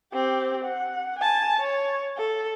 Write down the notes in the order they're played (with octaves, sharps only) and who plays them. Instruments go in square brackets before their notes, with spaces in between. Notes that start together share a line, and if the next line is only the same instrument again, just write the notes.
[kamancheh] C4 G4
F#5
G#5 A5
C#5
A4